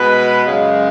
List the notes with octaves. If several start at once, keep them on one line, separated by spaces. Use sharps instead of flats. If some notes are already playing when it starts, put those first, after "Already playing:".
Already playing: B2 G#3 B4
F#2 C#3 G#3